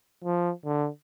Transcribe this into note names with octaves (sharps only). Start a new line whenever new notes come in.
F3
D3